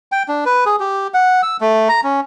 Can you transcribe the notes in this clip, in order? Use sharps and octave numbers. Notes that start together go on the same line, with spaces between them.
G5
D4
B4
G#4
G4
F#5
E6
A3
A#5
C#4